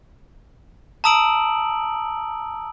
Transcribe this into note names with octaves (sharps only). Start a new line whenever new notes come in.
A5 A#5 D#6 E6 D7 F#7